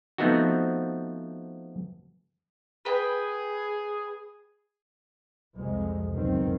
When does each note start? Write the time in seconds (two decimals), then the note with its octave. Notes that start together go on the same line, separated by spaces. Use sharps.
0.18 F3 A3 B3 C4 D#4 F#4
2.85 G#4 B4 G5
5.55 C2 F2 C3 G#3
6.14 F#1 C#2 B2 D#3 C4